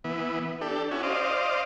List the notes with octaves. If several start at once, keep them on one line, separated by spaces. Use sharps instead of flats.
E3 B3
D4 G4 A4
C#4 E4 F#4 G#5
C5 D5 D#5 F5